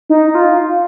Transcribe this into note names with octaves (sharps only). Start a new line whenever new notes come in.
D#4
F4